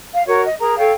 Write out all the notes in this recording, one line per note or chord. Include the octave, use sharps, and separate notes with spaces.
F5
F#4 A#4 C#5
D#5
G#4 A#4 A#5
A4 C#5 F5 G5